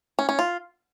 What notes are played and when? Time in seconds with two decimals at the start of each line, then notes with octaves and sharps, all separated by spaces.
0.19 C#4
0.29 C#4
0.39 F4